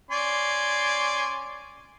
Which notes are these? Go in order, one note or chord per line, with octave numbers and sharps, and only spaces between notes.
C#4 D5 C6